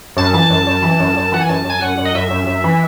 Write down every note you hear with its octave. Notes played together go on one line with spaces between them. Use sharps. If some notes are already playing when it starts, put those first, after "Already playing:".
F#2 A5
E3
F#2
F#2
E3
F#2
F#2
E3 F#5
G#5
F#2 A5
F#2 G#5
F#2 F#5
F#2
D#5
F#2 E5
F#2
F#2
E3